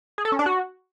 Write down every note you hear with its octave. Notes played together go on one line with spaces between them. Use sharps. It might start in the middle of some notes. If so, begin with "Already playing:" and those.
G#4
A4
C#4
D4
F#4